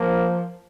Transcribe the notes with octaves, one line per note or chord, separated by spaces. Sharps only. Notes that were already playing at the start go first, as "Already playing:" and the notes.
Already playing: F3 A#3